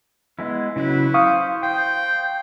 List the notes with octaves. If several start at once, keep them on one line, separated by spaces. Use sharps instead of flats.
G#3 B3 E4
C#3 F#3 E4 B4
C5 F5 C#6 D#6
C5 G5